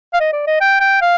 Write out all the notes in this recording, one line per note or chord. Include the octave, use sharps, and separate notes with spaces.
F5
D#5
D5
D#5
G5
G5
F5